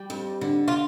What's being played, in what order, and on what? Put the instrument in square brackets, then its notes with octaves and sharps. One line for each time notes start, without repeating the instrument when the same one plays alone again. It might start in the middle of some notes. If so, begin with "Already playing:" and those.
Already playing: [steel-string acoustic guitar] G3 [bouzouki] G4
[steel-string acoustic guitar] F2
D3
[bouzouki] F4